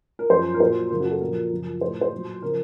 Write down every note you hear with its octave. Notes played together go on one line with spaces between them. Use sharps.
A#4
F#2 F3 C5
A#4
A#2 F#3 C5
F#2 C#3 F#3 A#4
F#4
A4
A#2 F3 A#4
F#2 C#3 F3
A2 F#3 C5
C5
A#2 F#3
C#3 F3 A#4